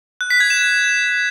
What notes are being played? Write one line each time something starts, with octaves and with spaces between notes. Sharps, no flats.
F#6
B6
G#6
E7